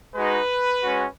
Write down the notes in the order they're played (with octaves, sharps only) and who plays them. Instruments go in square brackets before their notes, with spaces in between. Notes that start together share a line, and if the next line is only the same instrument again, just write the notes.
[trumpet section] G#3 D#4 F#4 B4
G#3 C#4 F#4